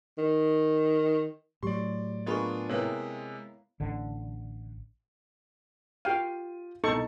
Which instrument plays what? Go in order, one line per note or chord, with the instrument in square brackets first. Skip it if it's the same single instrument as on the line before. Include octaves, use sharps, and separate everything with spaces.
[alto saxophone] D#3
[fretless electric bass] A2 F#3 [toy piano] G4 [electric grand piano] D5 C6
[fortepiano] A#3 G#4 [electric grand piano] B3 D4 F4 [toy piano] D#5 B5 C#6
[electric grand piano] C3 G#3 [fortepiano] A#3 B3 E4 [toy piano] C#5
[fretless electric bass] A1 D3
[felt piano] F4 G4 D#7 [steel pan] F5 G5
[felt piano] C2 B2 [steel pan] D#4 A4 C#6